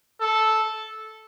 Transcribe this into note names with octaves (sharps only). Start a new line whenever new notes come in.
A4